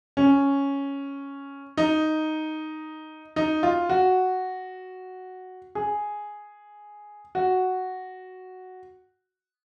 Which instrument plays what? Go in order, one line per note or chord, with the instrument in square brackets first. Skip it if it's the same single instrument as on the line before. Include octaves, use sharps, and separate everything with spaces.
[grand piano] C#4
D#4
D#4
F4
F#4
G#4
F#4